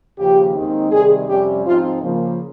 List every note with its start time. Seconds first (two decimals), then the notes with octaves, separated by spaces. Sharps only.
0.18 D#2 C#3 F3 G4
0.55 D#2 D#3 G#3 C4 D#4
0.91 C3 D#3 G3 G#4
1.28 F2 C3 G3 C#4 G4
1.65 G#2 F3 C4 D#4 F4
2.02 C#3 F3 A#3